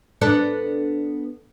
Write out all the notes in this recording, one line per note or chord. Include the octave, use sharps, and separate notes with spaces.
B3 D4 A4